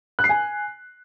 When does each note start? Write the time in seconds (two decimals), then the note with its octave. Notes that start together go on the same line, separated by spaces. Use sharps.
0.19 F#6
0.24 C7
0.29 G#5